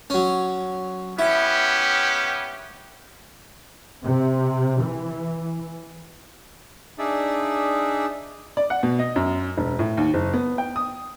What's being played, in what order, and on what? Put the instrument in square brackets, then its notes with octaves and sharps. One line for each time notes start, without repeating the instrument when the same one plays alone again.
[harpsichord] F#3 C#4
[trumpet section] B3 C#4 G4 [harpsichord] E4
[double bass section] C3
E3
[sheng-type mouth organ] D4 D#4 G#4 D5 E5
[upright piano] D5
F#5
B2
D#5
F#2
E1
A2
D#2
F#1
B3
G5
D#6